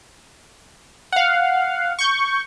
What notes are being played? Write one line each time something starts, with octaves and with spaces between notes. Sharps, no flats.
F5 F#5
C#6 G6